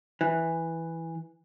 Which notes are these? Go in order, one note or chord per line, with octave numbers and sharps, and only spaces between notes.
E3